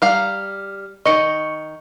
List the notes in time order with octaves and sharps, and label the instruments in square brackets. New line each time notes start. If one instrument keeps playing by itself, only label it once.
[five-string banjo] G3 F5 A#5 [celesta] F6
[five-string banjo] D#3 D#5 [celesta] C#6 C#7